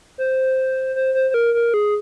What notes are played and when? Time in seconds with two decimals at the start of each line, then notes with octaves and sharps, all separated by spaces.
0.18 C5
0.96 C5
1.14 C5
1.30 C5
1.34 A#4
1.54 A#4
1.74 G#4